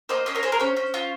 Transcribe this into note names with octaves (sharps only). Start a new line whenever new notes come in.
A#3 C5 D#5
C#4 C5 D#5
A#4 C#5
G#4 C5
A#4
C#4 C5
C#4
F4